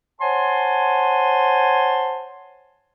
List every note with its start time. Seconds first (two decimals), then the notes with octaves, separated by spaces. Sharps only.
0.20 C5 C#5 F#5 G#5 A5 C6